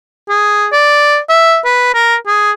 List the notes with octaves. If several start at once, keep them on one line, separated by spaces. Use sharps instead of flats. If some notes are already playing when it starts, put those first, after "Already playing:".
G#4
D5
E5
B4
A#4
G#4